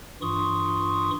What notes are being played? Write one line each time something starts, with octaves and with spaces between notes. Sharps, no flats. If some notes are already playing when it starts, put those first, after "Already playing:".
G2 E3 F4 C6 C#6 D#6